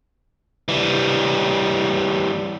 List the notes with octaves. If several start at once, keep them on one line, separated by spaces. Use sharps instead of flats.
E3 G3